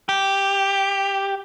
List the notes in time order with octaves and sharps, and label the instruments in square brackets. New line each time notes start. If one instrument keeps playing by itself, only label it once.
[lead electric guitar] G4